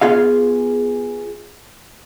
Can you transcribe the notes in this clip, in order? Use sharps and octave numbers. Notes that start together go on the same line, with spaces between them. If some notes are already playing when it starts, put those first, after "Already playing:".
B3 F4 G#4 F5